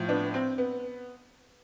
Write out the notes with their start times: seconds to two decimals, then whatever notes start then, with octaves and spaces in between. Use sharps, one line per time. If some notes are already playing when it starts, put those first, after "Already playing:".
Already playing: A2 F3
0.09 B3 D4
0.34 C4
0.58 B3